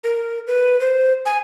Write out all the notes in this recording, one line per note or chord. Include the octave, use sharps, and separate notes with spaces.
A#4
B4
C5
G#5